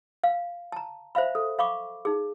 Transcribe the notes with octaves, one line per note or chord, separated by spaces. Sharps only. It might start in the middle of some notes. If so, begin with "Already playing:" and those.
F5
A5 A#5
C5 E5 F5 B5
A4
F5 B5 C#6 D6
D#4 G#4